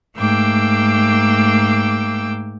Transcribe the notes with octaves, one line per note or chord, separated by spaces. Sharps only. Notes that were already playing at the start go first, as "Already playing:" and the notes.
G#2 A3 A#3 G5 D6 E6